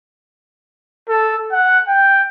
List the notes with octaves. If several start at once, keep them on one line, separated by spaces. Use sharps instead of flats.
A4
F#5
G5